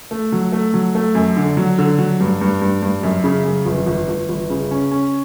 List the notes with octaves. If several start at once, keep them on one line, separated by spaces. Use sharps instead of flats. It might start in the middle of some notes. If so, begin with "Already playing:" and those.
A3
F#3
A3
F#3
A3
F#2
D3
F#3
D3
F#3
G2
G2
G2
G2
F#2
C#3
F#2
G1
G1
G1
G1
C#3
C#4
C#4